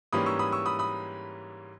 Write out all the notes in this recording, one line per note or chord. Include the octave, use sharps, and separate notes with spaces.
G#2 E3 G3 A#3 C#4 B5 D#6
C#6 E6
B5 D#6
C#6 E6
B5 D#6
B5 D#6